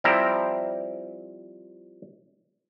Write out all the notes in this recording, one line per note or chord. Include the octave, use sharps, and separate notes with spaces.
F3 G3 C4 E4 G5 A#5